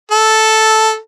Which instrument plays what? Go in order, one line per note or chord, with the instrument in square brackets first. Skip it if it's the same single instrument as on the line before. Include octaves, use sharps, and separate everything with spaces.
[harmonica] A4